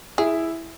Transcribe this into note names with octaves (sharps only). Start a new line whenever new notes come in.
E4 G#4